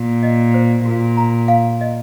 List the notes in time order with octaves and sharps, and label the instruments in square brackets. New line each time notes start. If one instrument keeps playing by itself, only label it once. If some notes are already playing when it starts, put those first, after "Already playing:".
Already playing: [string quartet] A#2
[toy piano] D#5
C5
[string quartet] A#2 [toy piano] F#4
[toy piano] A#5
F5
D#5